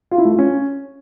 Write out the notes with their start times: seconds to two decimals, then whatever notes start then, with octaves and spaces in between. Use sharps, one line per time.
0.11 F4
0.18 E4
0.25 A3
0.32 F4
0.39 C#4